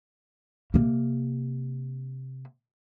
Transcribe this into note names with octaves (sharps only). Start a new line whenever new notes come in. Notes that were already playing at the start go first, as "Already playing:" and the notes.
C3 A#3